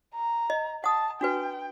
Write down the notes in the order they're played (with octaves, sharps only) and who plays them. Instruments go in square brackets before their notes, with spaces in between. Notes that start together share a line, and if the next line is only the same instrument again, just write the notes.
[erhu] A#5
[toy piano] D#5
[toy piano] F#5 D#6 [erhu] A5
[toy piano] D4 F#4 B4 [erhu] G5